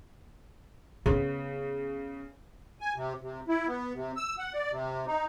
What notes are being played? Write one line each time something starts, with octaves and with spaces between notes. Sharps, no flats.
C#3 B3
G#5
C3
C3
E4
B3
C3
E6
F#5
D5
C3
D#4